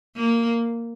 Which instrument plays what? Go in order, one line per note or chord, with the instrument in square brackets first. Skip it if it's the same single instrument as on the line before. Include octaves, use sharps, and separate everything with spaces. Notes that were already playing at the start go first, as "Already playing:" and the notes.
[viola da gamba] A#3